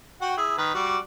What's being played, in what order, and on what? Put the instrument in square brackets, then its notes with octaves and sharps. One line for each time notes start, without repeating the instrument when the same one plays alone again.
[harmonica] F#4 F#5 G5
E4 G#4
D#3 B4
G3 F#4 D5